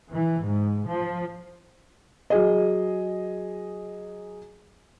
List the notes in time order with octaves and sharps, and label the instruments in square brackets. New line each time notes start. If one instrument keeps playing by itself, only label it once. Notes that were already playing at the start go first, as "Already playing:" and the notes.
[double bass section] E3
G#2
F3
[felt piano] F#3 G#4 D#5